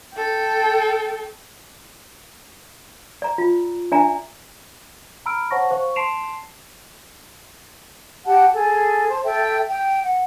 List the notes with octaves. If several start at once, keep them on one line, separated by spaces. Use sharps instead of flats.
A4 G5
D5 A#5
F4
D4 D5 E5 G#5 A#5
A#5 B5 E6 F6 D7
C5 C#5 F#5 A5 C#6 A#6
C5 F5 C#6
A5 C6 C7 D7 E7 F7
G4 F#5 G5 A5
G#4 A4 G#5
C5 A5
A4 E5 G5
G5
F#5